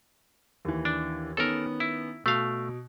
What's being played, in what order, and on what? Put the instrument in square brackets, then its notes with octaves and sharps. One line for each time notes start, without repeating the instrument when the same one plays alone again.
[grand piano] D#2 E3
[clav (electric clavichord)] D4
[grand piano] D#3 B3 C#4 [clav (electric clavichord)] A4 A#4
[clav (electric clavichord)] E4
[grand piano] B2 [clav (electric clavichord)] A3 F5